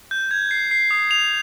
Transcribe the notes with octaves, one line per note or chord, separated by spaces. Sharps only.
G6
G#6
C7
C7
D#6
F7